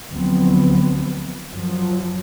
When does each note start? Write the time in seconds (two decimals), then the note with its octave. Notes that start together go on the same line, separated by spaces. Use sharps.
0.12 D2 F3 F#3 B3 C4
1.53 F#2 F3 F#3